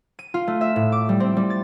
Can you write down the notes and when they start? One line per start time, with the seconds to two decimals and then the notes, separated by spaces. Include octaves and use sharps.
0.19 D#7
0.34 F4
0.47 A3
0.61 E5
0.76 A2
0.92 D6
1.09 G3
1.20 C4
1.37 G3
1.50 A6